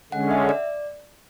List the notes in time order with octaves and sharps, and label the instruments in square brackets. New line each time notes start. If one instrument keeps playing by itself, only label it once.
[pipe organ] D3 G#3 C#4 [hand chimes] F#5
[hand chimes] E5
D5